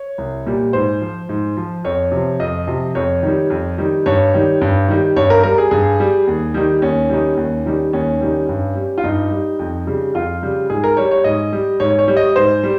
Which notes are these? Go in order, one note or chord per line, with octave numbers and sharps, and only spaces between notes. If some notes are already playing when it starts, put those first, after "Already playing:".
Already playing: C#5
C2
A#2 G3
G#2 C5
F3
G#2
F3
F2 C#5
C3 F3
F2 D#5
C3 F3
F2 C#5
D#3 G3
F2
D#3 G3
G2 C#5
D#3 G3
G2
D#3 G3
G2 C#5
A#4
G3 A#4
G#4
G2 G#4
G3
D#2
D#3 G3
D#2 C#4
D#3 G3
D#2
D#3 G3
D#2 C#4
D#3 G3
G2
G3
F4
G2 D#4
G3
F2
C#3 G3
F2 F4
C#3 G3
G#2 G#4
A#4
G3 C#5
C#5
G#2 D#5
G3
G#2 C#5
C#5
G3
D#5
G#2 C5
G3